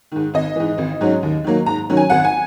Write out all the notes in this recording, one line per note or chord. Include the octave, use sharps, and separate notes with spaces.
G#2 D#3
G#1 D#5
G#2 E3
G#1
G#2 F#3 C#4
D#2
D#3 F#3 A#3
G#2 A#5
D#3 F#3 C#4
G#5
G#1 F#5
G#5